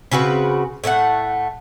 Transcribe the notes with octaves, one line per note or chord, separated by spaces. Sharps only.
C#3 C4 F#4 B4
A2 A3 D4 F#5